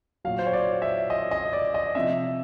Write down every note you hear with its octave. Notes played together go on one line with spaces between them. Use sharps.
A#2 F#3 F5
C5
C#5
D5
E5
D#5
D#5
D5
D#5
C3 F3 E5